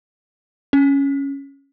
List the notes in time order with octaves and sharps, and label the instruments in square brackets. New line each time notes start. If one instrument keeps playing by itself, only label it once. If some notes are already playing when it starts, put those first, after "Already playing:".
[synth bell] C#4